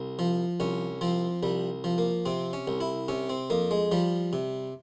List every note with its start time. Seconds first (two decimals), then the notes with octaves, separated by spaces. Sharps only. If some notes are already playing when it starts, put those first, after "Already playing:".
Already playing: C2
0.19 F3
0.60 C2 C#4
1.01 F3 C4
1.43 C2 G3
1.84 F3
1.98 A#3
2.26 C3 C4
2.53 C#4
2.68 C2
2.81 E4
3.08 C3 C#4
3.29 C4
3.50 F2 A#3
3.71 G#3
3.92 F3 G3
4.33 C3